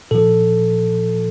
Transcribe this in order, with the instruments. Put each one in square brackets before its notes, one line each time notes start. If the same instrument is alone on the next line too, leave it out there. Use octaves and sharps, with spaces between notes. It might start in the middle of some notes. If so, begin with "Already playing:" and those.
[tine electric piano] A#2 F3 A4